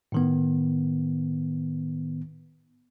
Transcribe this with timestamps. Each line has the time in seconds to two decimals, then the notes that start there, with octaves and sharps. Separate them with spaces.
0.12 A2 D#3 B3